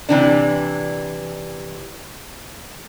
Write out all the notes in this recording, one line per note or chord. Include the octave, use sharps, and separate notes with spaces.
C3 E3 D4